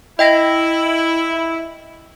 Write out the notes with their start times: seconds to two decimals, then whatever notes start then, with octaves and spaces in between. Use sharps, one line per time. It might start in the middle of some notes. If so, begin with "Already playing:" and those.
0.19 E4 D#5 G5 A#6